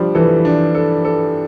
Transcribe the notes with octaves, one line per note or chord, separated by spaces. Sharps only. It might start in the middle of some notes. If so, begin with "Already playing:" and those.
Already playing: F3 G3 D4
E3 A4
D4
A4
A4